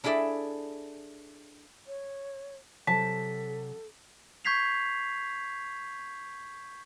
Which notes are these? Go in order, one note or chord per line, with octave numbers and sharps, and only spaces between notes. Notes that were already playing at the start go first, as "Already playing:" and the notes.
D4 E4 G#4 A4 D5 E5
C#5
C3 F#3 A4 C5 A5 B6
C#6 G6 G#6 B6 C7 F7